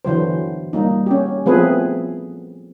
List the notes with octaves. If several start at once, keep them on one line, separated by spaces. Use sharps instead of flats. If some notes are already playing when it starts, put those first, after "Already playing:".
D3 E3 F#3 C5
G3 A#3 D#4
C#4 G4
F3 A3 B3 C4 G#4 B4